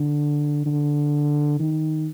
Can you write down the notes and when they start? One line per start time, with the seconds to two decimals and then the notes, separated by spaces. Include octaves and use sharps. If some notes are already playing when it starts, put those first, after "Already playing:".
Already playing: D3
0.66 D3
1.60 D#3